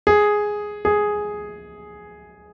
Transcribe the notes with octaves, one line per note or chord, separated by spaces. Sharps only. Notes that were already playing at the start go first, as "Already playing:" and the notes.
G#4
G#4